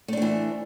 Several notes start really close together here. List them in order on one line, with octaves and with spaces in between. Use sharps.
A3 D4 C4 E3